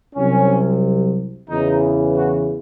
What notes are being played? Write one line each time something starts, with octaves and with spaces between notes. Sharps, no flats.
C2 C3 F#3 C#4
E2 C#3 E3 D#4
F#4